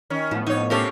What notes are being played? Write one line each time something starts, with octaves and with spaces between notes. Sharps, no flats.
D#3 C#4
A2 F3 B3
F2 D#4 C#5
C3 C#4 F4 G4 A4 A#4